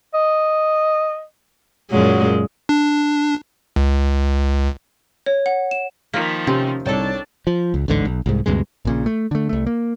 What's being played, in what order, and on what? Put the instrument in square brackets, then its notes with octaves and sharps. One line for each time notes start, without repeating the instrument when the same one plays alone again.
[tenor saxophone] D#5
[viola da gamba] F#2 A#2 G#3 [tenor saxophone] F#3
[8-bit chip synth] D4
C#2
[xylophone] C#5
F#5
E7
[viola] D#3 F3 [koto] A#3 [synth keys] B6
[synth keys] C3 [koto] C4 [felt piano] C#4 G4
[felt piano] C2 [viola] D4 A5 [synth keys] D#4 C#5 [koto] A4 G5
[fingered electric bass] F3
C#2
A1 D2 G#2 D3
B1
C2 G#2
D2 G2 C3 G#3
[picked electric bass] A#1 A#2 C#3
A3
D3 A3
C2 A3
A#3